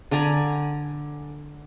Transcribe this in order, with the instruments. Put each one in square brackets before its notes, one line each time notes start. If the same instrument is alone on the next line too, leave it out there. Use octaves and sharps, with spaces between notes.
[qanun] D3 D5 G#5 A#5